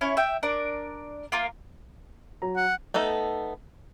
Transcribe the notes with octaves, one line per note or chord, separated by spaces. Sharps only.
C#4 E4 C#5
E5 G5
D4 A#4 D5
A#3 F4 A#4
F#3 A#5
F#5
A3 B3 D#4 A4